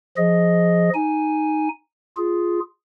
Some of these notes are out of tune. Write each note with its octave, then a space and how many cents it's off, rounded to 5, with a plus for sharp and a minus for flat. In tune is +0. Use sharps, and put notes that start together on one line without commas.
F3 +0 G#4 +0 D#5 +0
D#4 +0 G#5 +0
F4 +0 G#4 +0